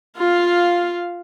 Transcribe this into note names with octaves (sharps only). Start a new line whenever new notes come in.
F4 F5